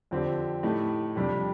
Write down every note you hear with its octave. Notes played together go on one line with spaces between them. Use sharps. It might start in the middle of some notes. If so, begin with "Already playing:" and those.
F2 D3 F3 C4 G4
A2 A3 D#4 G4
F2 C3 G3 D4 G4